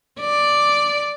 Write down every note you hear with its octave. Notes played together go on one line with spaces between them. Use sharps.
D5